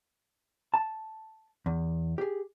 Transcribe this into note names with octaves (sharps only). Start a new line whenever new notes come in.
A5
E2
G4 G#4